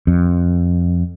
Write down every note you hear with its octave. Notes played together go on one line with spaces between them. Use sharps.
F2